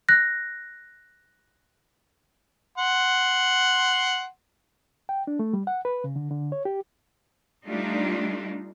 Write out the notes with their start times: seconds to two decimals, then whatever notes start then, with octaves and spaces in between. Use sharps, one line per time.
0.09 F#6 A#6
2.77 F#5 C6
5.09 G5
5.27 D4
5.39 A3
5.53 G3
5.67 F#5
5.85 B4
6.04 C#3
6.16 D3
6.31 D3
6.52 C#5
6.65 G4
7.66 G3 A3 D4 D#4 F4